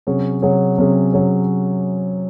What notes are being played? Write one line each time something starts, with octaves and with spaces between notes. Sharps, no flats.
C3 F#3 C#4 G#4 C#5
C3 F#3 C#4 G#4 C#5
C3 F#3 C#4 G#4 C#5
C3 F#3 C#4 G#4 C#5